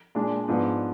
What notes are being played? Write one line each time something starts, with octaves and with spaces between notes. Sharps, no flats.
A#2 G#3 D4
G#2 F3 B3 D4